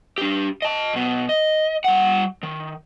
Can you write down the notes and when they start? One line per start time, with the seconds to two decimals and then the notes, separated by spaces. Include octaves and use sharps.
0.18 D4 G4
0.62 D#5 A5
0.93 B1 B2
1.29 D#5
1.84 G3 F#5
2.43 D#3